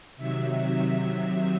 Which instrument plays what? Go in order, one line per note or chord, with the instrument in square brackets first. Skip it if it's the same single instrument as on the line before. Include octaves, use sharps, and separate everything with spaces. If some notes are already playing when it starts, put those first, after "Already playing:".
[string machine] C3 D#3 F#3 E5